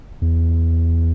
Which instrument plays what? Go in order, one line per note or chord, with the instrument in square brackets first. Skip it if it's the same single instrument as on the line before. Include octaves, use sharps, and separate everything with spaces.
[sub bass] E2